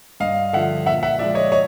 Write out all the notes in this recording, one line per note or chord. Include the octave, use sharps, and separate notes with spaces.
G2 D#5 F5
D3 F3 E5 F#5
A#2 E5 F#5
E5 F#5
F3 G#3 D5 E5
C#5 D#5
C#5 D#5